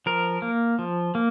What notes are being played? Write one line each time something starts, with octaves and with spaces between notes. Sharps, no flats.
F3 A#4
A#3
F3
A#3